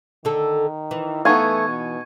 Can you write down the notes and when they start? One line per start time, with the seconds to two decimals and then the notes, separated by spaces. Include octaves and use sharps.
0.25 D3 D#3 A4
0.91 E3
1.25 A3 B3 D#4 F5 G#5 C#6
1.68 B2